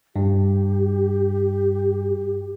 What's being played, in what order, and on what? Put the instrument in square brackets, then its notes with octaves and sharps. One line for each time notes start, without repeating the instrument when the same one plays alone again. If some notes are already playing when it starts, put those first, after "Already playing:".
[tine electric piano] G2 [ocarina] G4